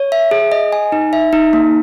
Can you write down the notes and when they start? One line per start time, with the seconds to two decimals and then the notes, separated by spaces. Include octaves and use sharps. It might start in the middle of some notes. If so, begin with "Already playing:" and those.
Already playing: C#5
0.12 E5
0.31 G#4
0.52 D#5
0.72 G#5
0.92 D#4
1.13 E5
1.33 D#4
1.53 A#3